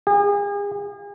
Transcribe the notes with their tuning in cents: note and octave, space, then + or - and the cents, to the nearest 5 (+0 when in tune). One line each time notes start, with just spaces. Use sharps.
G#4 -40